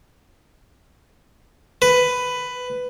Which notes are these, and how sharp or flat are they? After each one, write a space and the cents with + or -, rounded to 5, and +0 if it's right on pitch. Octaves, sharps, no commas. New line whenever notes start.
B4 +10